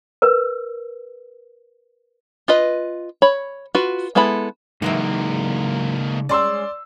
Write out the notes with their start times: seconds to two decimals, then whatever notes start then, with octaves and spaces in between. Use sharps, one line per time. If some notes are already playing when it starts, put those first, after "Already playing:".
0.22 A#4 B4
2.48 F4 B4 D#5
3.22 C#5 B5
3.75 F4 F#4 B4
4.15 G#3 B3 E4 A4 B5
4.82 C#3 E3 F#3 G#3 A#3 D#4 E5
6.29 G#3 C#4 D5 C6 E6